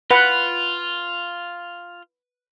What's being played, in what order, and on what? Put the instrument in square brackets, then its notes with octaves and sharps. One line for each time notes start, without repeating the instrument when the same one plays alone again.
[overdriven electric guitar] F4 [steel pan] B4 F#5